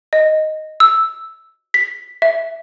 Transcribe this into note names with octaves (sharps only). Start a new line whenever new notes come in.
D#5
E6
B6
E5